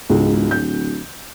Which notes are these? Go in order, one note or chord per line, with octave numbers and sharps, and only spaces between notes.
E1 C#2 G#2
D1 G6